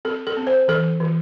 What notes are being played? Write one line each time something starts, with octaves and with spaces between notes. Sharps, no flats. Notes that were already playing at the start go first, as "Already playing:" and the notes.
C4 A4
A4
C4
C5
E3 A4
E3